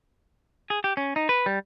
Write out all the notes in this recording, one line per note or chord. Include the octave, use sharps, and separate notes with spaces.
G#4
G4
C#4
D#4
B4
G3